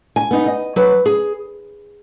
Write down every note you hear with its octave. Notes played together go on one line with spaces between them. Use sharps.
G#5
B3 D#4
D#5
F#3 B4
G#4